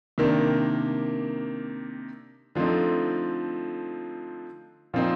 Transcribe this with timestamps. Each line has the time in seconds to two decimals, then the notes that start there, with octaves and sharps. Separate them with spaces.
0.18 C3 D#3 A#3 D4
2.55 D3 F3 A3 C4 D#4
4.94 A#2 F3 C4 D#4